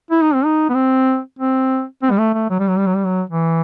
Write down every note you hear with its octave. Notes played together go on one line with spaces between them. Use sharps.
E4
D#4
C4
D#4
B3
C4
C4
C4
G3
A3
A3
F#3
G3
F#3
G3
F#3
G3
F#3
E3